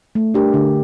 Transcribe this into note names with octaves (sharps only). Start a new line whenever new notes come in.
A3
D4 G4 A#4
D3